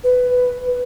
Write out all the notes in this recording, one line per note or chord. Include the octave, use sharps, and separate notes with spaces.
B4